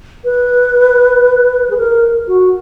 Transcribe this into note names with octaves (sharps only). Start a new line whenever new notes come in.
B4
G#4
A#4
F#4